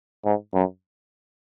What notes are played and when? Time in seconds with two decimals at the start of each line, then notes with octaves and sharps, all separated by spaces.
0.25 G#2
0.54 F#2